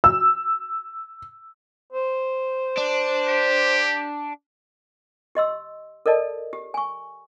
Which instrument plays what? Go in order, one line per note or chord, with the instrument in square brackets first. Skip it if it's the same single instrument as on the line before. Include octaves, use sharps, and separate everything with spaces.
[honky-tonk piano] E6
[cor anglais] C5
[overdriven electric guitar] D4
[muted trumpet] G4
[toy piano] G4 D#5 C6 E6
A4 A#4 D5 D#5 A5
G4
G#5 C#6